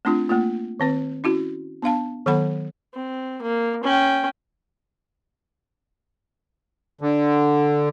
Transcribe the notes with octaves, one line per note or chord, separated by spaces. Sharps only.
A3 C4 D4 F4
A3 A#3 F4
D#3 C4 B4
C#4 E4 F#4
B3 D4 F5 A5
D#3 F#3 B3 A4 F#5 B5
C4
A#3
C#4 G5
D3